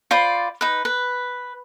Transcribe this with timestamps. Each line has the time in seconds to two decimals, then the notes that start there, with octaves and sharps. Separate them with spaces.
0.11 F4 C5 D5 B5
0.61 D#4 B4
0.85 B4